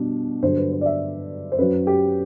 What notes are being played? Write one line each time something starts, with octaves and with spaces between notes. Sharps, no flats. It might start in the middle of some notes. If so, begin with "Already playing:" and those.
Already playing: B2 G3 D4
G2 D3 F#3 C5
B4
C5
D5
E5
C5
F#2 F#3 B4
G4